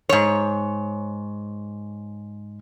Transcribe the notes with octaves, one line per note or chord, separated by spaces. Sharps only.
G#2 C#5